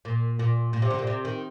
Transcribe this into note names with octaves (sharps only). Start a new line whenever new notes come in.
A#2
A#2
A#2
C3
D3
A#2
C3
D#3